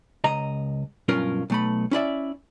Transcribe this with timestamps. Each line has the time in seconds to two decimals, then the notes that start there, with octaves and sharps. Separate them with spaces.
0.24 C#2 D#5 A#5
1.08 B1 G2 C#4 F4 A#4
1.50 B1 A3 B5
1.91 C#4 E4 D5 E5